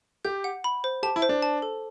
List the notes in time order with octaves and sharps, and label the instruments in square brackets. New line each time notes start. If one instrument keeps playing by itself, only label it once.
[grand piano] G4 [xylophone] G6
[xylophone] F#5
B5
C5
[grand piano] G4 [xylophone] A5
[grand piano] E4
[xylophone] C5
[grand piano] D4
[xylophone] A5
A4